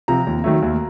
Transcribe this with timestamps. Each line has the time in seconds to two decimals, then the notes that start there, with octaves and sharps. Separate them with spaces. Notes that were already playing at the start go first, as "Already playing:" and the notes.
0.08 C3 F3 A#5
0.27 D#2
0.44 D#3 F#3 A3
0.62 D#2